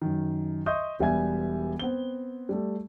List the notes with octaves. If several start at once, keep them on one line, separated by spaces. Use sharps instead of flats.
F#2 D#3
D#5 E5 C6 C#6 D#6 G6
E1 G3 B3 E5 G#5 G#6
B3 C4 G7
G3 A3